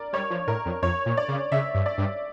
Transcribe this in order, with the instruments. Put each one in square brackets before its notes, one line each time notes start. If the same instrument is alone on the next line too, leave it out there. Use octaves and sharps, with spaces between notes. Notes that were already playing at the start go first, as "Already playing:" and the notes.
Already playing: [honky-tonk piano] A#4 D5
[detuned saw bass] G3 [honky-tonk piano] C#5
[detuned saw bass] F3
[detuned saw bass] A2 [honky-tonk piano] A#4
[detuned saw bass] F2
[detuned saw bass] F2 [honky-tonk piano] C#5
[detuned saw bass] A#2
[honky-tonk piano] D5
[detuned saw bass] C#3
[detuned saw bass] C#3 [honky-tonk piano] E5
[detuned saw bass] G2
[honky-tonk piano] D5
[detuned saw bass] G2